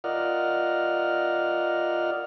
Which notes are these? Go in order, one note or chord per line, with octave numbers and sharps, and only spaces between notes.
F4 A#4 D5 D#5 F#5 F6